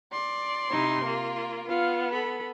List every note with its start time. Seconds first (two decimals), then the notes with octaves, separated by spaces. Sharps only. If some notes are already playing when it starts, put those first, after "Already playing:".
0.12 D5 C6
0.71 C3 D#4 E4
1.04 A#3 F4
1.68 B3 F4 F5
2.13 A4 B5